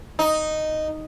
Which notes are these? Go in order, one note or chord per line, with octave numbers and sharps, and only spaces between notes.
D#4